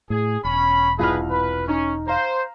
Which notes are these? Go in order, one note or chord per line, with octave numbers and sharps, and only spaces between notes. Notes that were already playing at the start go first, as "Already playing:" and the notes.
A2 G#4
E1 C#4 B5
C2 D#4 F4 G#4 B4 F6
B4
C#4 D#4
C5 F5 A#5